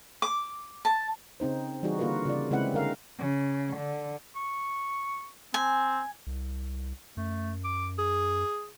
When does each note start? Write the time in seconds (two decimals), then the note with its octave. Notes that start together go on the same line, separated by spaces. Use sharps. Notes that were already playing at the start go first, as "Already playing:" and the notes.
0.22 D6
0.85 A5
1.40 C#3 C4 D#4 C5
1.83 E3 G3 D#4 F#4 G#4
1.99 D3 A#3 F4 F#4 A#4 B4
2.25 C#3 F4 D5
2.51 C#3 G#3 C4 E4 B4 F#5
2.74 D3 A#4 F5
3.17 C#3
3.75 D3
4.36 C#6
5.54 C4 G#5
6.27 C2
7.17 F#2 A3
7.65 D6
7.99 G#4